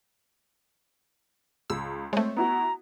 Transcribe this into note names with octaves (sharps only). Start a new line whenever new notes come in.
C#2 E6
G#3 A3 C4 C5 C#5
B3 E4 F#4 A#5